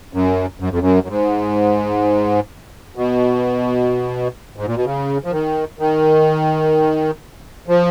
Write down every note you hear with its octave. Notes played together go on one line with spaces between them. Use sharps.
F#2
F#2
F2
F#2
F#2
G#2
B2
G#2
A#2
B2
C#3
F3
D#3
D#3
F3